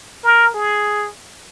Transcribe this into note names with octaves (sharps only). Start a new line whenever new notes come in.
A#4
G#4